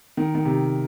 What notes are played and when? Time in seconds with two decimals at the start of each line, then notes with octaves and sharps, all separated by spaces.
0.17 D#3
0.35 D#3
0.45 C3